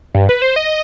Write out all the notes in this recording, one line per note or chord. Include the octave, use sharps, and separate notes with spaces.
G2
B4
C5
D#5